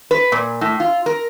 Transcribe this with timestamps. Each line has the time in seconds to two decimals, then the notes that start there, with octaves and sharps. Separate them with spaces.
0.11 B4
0.32 A#2
0.61 A2
0.80 F4
1.06 A#4